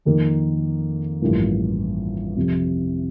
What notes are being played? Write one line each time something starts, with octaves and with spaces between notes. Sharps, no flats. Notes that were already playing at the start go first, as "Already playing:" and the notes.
F2 D#3 A#3
A1 G2 F3 A#3
F2 C3 F3